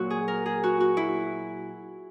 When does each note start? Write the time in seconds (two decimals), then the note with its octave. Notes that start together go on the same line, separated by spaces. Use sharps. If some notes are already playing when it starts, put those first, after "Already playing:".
Already playing: A#2 F#3 F#4
0.10 G#4
0.28 A#4
0.46 G#4
0.64 F#4
0.80 F#4
0.97 E4